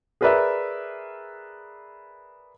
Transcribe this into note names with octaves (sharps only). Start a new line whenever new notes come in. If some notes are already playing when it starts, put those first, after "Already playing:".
G#4 A#4 B4 D5 E5